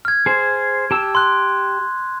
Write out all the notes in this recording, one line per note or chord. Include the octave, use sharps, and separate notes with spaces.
F6 G#6
G#4 C5
G4 A5 E6
C6 F#6